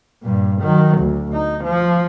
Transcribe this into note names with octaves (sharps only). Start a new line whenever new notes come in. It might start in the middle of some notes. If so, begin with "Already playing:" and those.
G2 A#2
D#3 F#3
D2
D#4
F3